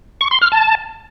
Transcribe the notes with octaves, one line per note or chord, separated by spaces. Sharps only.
C#6
C6
F6
A5